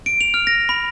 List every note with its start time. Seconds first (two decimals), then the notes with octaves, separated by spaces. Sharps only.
0.06 D7
0.21 F7
0.34 F6
0.47 A#6
0.69 B5